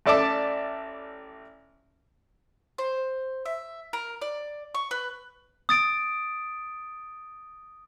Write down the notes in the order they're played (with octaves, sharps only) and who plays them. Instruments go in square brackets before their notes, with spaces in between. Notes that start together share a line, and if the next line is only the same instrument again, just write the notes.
[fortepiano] A1 A4 D5 E5 A5 D6
[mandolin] C5
E5
A#4
D5
C#6
B4
[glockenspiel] D#6 A6 D7